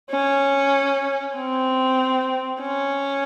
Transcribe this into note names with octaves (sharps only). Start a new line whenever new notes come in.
C#4
C4
C#4